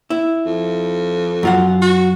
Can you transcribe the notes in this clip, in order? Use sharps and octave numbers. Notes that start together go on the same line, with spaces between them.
E4
F2
F#2 F4 F#5
F#4